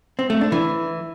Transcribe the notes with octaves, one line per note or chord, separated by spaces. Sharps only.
C4
A3
D4
E3